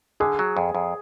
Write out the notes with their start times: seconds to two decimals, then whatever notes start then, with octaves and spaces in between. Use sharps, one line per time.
0.20 D3 G#4
0.39 F#3
0.57 F2
0.75 F2